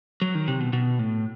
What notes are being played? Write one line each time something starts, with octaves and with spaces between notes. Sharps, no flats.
F#3
D#3
C3
B2
B2
A2